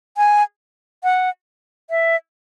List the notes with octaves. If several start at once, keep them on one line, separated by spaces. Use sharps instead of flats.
G#5
F#5
E5